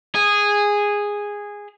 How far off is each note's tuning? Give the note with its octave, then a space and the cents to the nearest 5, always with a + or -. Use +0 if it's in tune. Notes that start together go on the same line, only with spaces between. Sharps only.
G#4 -10